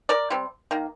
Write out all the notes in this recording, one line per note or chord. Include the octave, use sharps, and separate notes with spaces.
A#4 D5
C3 G3 C4
D#3 A#3